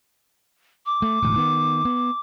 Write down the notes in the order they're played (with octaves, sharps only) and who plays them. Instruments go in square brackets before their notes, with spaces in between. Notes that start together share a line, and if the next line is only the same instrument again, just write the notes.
[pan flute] D6
[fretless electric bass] A3
E1 D2 A2
D#3 B3
B3